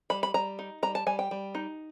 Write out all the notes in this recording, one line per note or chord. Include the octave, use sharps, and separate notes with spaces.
G3 B5
B5
G3 A#5
D#4
G3 A#5
A5
G3 G#5
G5
G3
D#4